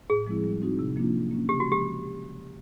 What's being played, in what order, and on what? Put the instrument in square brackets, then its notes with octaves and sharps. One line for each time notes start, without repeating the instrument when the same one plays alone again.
[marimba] A2 [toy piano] G#4
[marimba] F3 G#3 C4 E4
G3
C4 D#4 F#4
C3
F3 A#3 D4 F4
F#3
A#3 C#4
[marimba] C#3 [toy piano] G4
[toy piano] F#4
[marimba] F3 G#3
[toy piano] G4